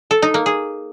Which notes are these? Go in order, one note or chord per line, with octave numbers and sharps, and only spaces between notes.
A4
D#4
A#3
G#4